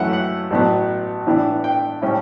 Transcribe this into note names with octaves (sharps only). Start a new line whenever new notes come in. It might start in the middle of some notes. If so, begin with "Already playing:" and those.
Already playing: F#2 E3 A3 C#4 E4 F#5
F#5
A1 A2 F#3 B3
A2 E3 B3 D4
G5
A2 G3 C#4 E4